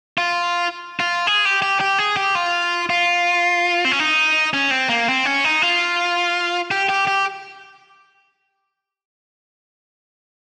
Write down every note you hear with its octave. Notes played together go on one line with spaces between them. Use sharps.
F4
F4
G#4
G4
G4
G4
G#4
G4
F4
F4
C4
C#4
D#4
C#4
C4
A#3
C4
C#4
D#4
F4
G4
G4
G4